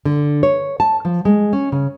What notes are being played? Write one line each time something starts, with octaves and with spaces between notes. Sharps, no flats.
D3
C#5
A5
F3
G#3
C#4
C#3